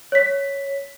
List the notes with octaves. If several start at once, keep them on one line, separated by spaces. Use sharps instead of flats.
C#5 B6